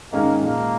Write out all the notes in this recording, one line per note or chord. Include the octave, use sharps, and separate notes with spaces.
G#2 D#3 G#3 A#3 C#4
A#2 F3 G#3 A#3